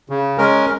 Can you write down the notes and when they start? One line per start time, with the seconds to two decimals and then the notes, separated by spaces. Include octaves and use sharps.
0.10 C#3
0.38 G#3 C#4 A#4